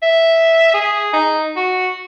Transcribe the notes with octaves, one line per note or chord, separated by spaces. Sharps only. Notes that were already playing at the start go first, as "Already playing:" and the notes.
E5
G#4
D#4
F#4